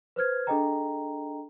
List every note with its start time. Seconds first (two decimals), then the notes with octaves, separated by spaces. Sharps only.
0.16 B4 C5 F6 G#6
0.47 D4 G#4 A4 D#5 G5 A#5